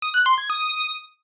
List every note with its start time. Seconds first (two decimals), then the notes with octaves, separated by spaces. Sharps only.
0.02 D#6
0.14 F#6
0.26 C6
0.38 G#6
0.50 D#6